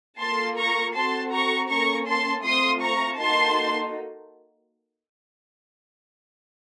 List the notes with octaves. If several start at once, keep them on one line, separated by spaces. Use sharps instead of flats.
A#3 F4 A4 A5 C6
A#5 C#6
C4 F#4 A4 A5 C6
A#5 C#6
A#3 C#4 A4 A#5 C#6
A5 C6
A3 C4 F4 C6 D#6
A#5 C#6
A#3 D#4 F#4 A4 A5 C6